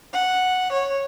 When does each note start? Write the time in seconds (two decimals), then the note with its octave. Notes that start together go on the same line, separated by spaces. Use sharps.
0.12 F#5
0.72 C#5